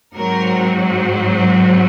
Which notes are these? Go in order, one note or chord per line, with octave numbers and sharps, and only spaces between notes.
G#2 F#3 C4 A#4